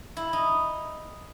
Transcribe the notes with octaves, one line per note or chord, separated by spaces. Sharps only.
E4
D#4